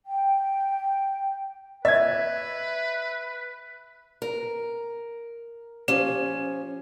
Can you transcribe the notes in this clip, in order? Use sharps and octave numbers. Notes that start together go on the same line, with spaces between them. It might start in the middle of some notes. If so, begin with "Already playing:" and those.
G5
B4 D#5 E5 G#6
A#4
F3 C#4 G4